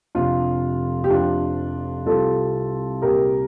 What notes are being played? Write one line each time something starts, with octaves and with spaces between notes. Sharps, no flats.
F1 F2 C3 D4 F4
G4
F1 F2 C3 D4 F4
C2 C3 G3 F4 A4
C2 A#2 G3 G4 A#4